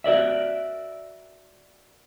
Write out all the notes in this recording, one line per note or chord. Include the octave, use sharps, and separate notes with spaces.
F#4 A#4 D5 E5